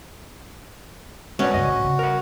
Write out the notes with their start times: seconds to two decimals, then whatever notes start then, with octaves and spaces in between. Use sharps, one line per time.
1.39 G#3 C#4 F#4 B4 D5
1.54 G2 C#3 D#5
1.68 A2
1.84 C#3
1.99 A#4 F#5